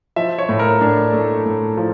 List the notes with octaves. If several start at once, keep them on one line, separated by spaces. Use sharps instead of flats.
F3 E5
C#5
A2
A#4
A2 D4
A3
A2
F3